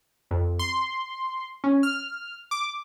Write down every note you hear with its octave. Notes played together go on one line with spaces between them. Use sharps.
F2
C6
C#4
F6
D6